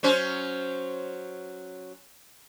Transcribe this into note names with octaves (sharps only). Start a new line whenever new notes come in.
F#3 C#4 C5